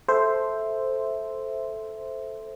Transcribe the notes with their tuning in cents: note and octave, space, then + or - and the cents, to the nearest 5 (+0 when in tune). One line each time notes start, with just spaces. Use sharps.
A4 -5 C5 +0 E5 +0